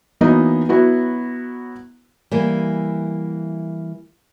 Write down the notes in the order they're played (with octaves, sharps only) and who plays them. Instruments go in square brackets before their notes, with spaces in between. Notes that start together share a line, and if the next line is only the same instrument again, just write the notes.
[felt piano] E3 F#3 A#3 B3 D#4 D#5
F#3 B3 E4 F#4
[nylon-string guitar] E3 G3 A#3